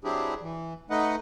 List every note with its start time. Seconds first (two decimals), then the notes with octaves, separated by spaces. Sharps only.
0.04 F#3 C4 D4 E4 G4 G#4
0.42 E3
0.90 A3 D#4 B4 D#5 F#5